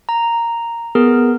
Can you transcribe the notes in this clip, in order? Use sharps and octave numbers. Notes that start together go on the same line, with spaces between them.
A#5
B3 G#4 A#4